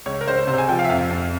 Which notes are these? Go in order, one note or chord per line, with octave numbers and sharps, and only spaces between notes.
C#2 C#5
A#4
C#2 C5
C3 C5
G#5
F3 G5
F5
E5
F2 F5
F2